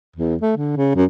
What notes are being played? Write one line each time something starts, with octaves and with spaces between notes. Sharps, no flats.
E2
A3
D3
C#3
F#2